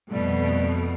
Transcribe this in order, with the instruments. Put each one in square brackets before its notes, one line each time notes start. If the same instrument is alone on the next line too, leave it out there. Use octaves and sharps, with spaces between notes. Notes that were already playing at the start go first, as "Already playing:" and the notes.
[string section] F2 B2 A3 [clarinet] G3